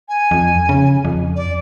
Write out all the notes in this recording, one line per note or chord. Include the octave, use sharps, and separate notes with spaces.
G#5
F2
C#3
F2
D5